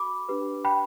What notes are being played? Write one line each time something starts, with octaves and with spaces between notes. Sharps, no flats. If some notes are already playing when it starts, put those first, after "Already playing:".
Already playing: F#4 A4 B5 D6
D4 G4 B4
G5 B5